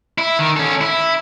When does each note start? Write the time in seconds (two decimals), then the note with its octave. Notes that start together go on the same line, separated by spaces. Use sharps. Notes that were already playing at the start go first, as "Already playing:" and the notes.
0.18 E4
0.39 D#3
0.57 C#4 A4
0.81 E4